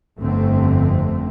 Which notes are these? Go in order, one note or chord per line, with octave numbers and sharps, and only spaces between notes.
G1 F2 D3 A3 C4